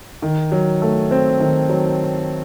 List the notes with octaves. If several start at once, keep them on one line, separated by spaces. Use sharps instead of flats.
D#3
F#3
A3
C4
D#3
F#3